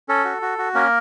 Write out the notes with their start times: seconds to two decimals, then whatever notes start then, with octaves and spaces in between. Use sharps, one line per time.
0.09 C#4 A4
0.25 F#4
0.42 F#4
0.58 F#4
0.74 A#3 C#4 A#4